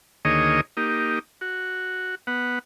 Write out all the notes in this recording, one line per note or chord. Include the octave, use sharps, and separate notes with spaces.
D2 D#3 A#3 G#4 C#5 D#5
A#3 D#4 G4
F#4
B3 F#5